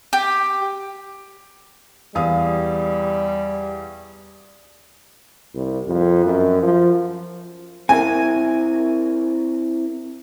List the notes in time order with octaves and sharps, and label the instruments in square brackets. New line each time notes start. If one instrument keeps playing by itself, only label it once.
[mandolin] G4
[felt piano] E2 F5 D#6 [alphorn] G3
[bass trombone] C2
F2
F#2
F3
[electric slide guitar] C4 E4 A#4 [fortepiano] G#5